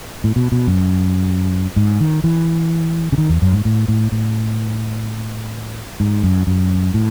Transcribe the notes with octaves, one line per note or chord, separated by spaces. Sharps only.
A2
B2
B2
F#2
G#2
D#3
E3
C#3
D#3
E2
F#2
G#2
A2
A2
A2
G#2
F#2
F#2
A2